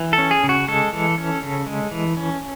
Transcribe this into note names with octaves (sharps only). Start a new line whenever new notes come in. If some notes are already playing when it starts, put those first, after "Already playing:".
Already playing: E3
A4
C#4
G#4
C#3
F#4
G#3 A4
E3
C#4
C#3
G#3
E3
C#4